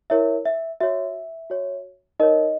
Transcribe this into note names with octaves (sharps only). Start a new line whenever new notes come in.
E4 A#4 C#5 E5
E5
F#4 C#5 E5
F#4 C#5
D#4 A#4 C#5 D#5